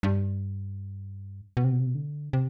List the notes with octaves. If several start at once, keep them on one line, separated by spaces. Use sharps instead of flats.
G2
B2
C3
B2
C3
B2
D3
C3